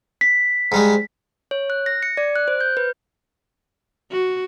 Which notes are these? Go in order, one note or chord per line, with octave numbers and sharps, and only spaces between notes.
B6
G#2 G3 G#3
C#5
F#6
A#6
C#7
D5
F#6
C5
G6
B4
F#4